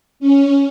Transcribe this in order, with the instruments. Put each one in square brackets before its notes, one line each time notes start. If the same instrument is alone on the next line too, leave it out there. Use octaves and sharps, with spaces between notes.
[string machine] C#4